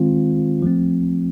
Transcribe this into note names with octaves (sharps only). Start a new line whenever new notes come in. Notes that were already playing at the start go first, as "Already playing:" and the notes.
Already playing: D#3 G#3 C4 F4
F3 A3 C4